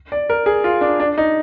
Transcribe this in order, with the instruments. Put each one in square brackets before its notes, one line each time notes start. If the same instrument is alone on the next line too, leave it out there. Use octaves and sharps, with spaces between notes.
[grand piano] D5
A#4
G#4
F4
D4
D4
D#4